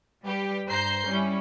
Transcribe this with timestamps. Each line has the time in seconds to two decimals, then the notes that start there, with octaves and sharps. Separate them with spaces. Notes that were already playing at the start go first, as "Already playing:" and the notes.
0.25 G3 G4 B4
0.67 G2 C5 A#5 G6 C7
1.08 G3 C#4 E4